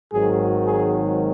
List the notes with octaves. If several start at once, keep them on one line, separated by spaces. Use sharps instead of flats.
G#1 G#2 D#3 F#3 G#4
G#4